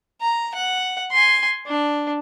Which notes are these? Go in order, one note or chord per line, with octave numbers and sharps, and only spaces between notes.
A#5
F#5
G#5 C6
D4